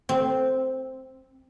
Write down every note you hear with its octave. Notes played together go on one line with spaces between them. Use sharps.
C4